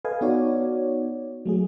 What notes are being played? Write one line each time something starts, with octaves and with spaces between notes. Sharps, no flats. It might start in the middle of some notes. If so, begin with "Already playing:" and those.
A4 B4 D#5 F5 G#5
B3 D#4 F#4 C#5 D5
F#3 A3 G#4